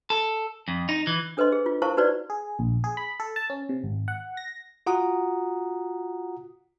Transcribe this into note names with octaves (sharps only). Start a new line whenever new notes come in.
A4
F2
D#4
E3
D4 A4 B4 C5 D#5 C6
G#4
F4
E4 A#4 C5 F5 A5 C#6
D#4 F#4 B4 C5 D5
G#4
A#1
G#4
B5
A4
A5
C#4
C3
G#1
F#5
A#6
F4 F#4 F#5 A#5 D#6